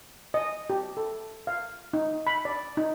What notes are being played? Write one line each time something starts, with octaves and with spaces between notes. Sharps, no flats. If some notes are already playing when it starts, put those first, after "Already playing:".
D#5
G4
A4
F5
D#4
B5
D5
D#4